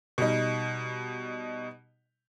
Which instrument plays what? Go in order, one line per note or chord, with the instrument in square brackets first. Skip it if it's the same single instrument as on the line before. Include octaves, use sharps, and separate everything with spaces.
[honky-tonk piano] B2 G3 D#4